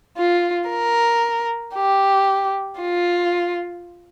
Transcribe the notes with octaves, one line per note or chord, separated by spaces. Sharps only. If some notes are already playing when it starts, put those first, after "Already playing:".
F4
A#4
G4
F4